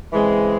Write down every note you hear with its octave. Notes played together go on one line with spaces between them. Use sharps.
C#3 E3 G#3 C4